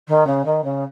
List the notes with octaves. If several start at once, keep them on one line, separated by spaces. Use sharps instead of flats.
D#3
C#3
D#3
C#3